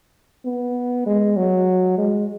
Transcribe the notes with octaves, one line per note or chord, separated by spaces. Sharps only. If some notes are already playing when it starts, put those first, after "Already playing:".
B3
G#3
F#3
G#3